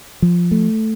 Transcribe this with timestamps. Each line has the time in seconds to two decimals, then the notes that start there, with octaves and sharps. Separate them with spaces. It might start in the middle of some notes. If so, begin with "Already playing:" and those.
0.22 F3
0.51 A3